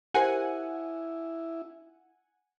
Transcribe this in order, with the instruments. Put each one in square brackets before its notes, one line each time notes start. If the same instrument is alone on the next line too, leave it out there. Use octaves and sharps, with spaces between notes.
[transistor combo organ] E4 [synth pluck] G4 A#4 C5 [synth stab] F#5 G#5